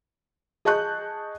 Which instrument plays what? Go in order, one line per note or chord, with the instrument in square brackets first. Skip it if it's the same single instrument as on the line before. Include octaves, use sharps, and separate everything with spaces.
[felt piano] G#4 D#5 A5 C#6 F#6 G6